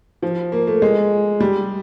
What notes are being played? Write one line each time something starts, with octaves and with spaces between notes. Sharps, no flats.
F3
A#3
A3
G#3
G3